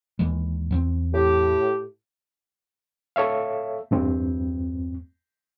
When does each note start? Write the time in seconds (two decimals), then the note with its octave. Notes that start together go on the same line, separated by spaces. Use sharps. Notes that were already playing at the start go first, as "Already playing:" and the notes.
0.19 D#2 E3 G#3
0.71 E2 A#3 C4
1.14 A2 G4
3.16 A4 C#5 E5 F5
3.91 E2 G2 C4